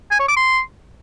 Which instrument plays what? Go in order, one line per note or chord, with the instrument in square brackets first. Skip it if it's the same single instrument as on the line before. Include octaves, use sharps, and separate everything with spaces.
[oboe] G#5
C#5
D6
C6